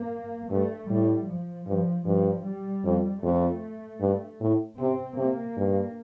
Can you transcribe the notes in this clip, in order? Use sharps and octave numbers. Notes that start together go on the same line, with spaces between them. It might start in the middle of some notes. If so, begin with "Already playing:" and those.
Already playing: A#3
G2 A3
A2 G3
F3
G2 F3
G2 F3
G3
F2
F2 A3
G2
A2
C3 C4
C3 A#3
G2